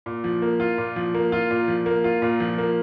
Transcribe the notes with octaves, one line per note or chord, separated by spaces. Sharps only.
A#2
F3
A#3
F4
A#2
F3
A#3
F4
A#2
F3
A#3
F4
A#2
F3
A#3